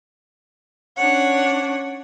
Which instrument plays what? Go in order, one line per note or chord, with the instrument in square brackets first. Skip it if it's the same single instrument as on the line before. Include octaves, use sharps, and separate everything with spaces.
[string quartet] C#4 D4 C#5 F#5